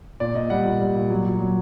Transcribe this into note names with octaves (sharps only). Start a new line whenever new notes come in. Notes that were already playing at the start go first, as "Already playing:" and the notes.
A#2 D5
A#2 D#5
G3 F#5
A#2
G3
A#2
F#3
F#3
F#3